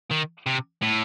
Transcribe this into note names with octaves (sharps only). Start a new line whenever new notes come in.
D#3
C3
A2